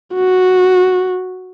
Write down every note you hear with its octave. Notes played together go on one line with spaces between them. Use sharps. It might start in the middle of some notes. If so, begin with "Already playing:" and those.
F#4